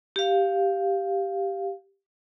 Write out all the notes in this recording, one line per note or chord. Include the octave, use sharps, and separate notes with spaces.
G4 F5